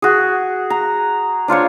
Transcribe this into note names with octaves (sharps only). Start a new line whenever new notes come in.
F#4 G#4
A#5
D4 F4 C5 C#5